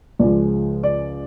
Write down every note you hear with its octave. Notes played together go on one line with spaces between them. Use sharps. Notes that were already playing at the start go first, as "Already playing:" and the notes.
C#2 C#3 F3 G#3 D5
D5